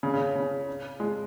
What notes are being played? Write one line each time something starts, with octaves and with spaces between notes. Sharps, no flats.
C#3
C#3
C#3
G#3